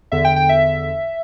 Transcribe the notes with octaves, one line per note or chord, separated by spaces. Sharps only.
E2 D3 E5
G5
G5
E5